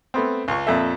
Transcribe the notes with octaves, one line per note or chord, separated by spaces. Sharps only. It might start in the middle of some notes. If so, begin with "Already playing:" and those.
A3 B3 C4
C#2 C#6
F2 A#2 A4 E5